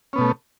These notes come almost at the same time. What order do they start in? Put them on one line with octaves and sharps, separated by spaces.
C#4 B3 B2 A3